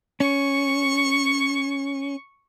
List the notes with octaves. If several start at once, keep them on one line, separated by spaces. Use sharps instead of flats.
C#4 C#6